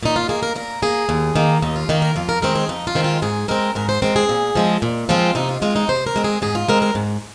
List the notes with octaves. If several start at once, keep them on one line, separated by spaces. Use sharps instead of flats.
A#2 D#4
F4
A#3 G#4
A#4
A#2 A#4
A#3 G#4
D#2
D#3 A#3
D#2 D#4
F4
D#3 A#3 D#4
A#4
F2 F4
A#4
D#3 G#3 C4 A#4
G#4
F2 D#4
F4
D#3 G#3 C4
F4
G#2 G#4
G#3 C4 A#4
G#2 A#4
C5
G#3 C4 A#4
G#4
A#2
F3 G#3 C4
A#2
F3 G#3 C4 F4
C3 D#4
F4
G#3 C4 F4
D#4
C3 C5
A#4
G#3 C4
G#4
G#2 G#4
F4
G#3 C4 A#4
A#4
G#2